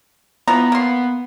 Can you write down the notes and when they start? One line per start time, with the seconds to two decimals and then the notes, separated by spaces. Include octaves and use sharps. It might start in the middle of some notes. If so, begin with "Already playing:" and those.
0.47 E3 F3 B3 A#5
0.72 A#3 C6